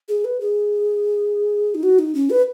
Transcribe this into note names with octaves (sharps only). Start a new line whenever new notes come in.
G#4
B4
G#4
D#4
F#4
D#4
C#4
B4